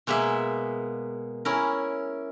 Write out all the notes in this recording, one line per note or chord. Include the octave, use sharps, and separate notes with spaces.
B2 G#3 A#3 G#4 E5
C#4 E4 A#4